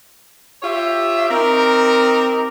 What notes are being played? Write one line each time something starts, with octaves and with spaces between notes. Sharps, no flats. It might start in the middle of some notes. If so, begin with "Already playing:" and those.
F4 G4 C#5 E5
C4 D#4 G4 A#4